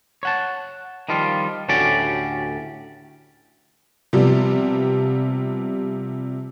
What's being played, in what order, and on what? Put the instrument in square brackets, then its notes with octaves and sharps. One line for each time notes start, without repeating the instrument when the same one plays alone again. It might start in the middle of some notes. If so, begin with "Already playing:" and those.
[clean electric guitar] C#5 F#5 A5
D#3 F3 G3 F4
D2 A2 C#4 F#4 G4 D5
[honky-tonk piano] C3 F3 G3 B3